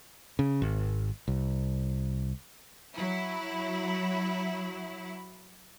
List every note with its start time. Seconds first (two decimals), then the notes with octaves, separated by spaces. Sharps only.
0.39 C#3
0.62 G#1
1.28 C2
2.95 F#3 E4